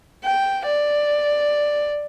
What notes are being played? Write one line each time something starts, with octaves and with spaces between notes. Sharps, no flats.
G5
D5